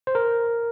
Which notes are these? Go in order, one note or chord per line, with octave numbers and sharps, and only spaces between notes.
C5
A#4